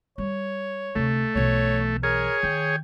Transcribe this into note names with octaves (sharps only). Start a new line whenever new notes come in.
G3 C#5
D2 C3 A3
B1 E3 C#5
G#4 A#4 C#5
D#3 G5